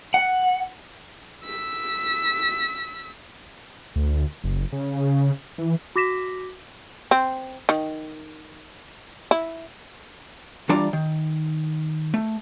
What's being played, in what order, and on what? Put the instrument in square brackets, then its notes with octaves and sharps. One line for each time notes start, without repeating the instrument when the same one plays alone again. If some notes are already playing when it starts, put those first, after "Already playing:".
[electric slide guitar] F#5
[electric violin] E6 B6
[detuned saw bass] D2
F#1
C#3
E3
[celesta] F#4 D6 A#6 B6 E7
[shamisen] C4
D#3
E4
[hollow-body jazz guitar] E3 G3 D4 F4 D5 A#5
D#3
A3